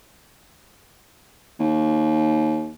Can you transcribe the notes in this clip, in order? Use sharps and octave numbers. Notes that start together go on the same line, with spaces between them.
D#2